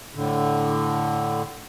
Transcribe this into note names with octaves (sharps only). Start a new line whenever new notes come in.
A2 D3